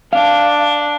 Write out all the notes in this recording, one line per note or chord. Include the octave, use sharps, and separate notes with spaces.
D4 F5